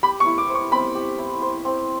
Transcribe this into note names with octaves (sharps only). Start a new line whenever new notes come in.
G4 B5
C#6
E4
D6
C5
C#6
C4 B5
G4
E4
C5
C4